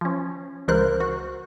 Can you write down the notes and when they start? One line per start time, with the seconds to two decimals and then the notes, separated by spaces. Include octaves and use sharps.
0.01 F3 C#4
0.68 C#2 E3 F4 A#4 C5 F#6
1.00 F#4